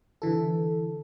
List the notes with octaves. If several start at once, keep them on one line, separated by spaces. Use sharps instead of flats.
D3 E3 A4